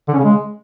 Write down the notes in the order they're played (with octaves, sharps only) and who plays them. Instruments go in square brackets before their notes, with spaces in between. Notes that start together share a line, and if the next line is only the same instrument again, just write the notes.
[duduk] D3
C#4
C#3
G#3